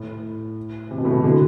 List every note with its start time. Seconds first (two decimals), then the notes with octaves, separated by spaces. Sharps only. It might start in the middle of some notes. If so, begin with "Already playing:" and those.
Already playing: A2
0.91 C3
0.98 B2
1.05 A2
1.12 B2
1.24 D3